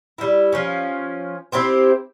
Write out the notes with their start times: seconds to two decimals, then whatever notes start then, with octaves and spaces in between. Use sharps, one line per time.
0.18 G3 E4
0.52 F3 C#4
1.52 C4 E4 G4 C5